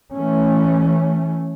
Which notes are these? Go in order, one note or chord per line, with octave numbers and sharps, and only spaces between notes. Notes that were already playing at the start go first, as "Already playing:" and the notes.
E3 A3 C#4